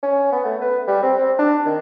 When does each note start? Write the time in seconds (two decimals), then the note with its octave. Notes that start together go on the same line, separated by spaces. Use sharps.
0.03 C#4
0.32 B3
0.45 A3
0.61 B4
0.87 G3
1.03 C4
1.18 C4
1.38 D4
1.66 D#3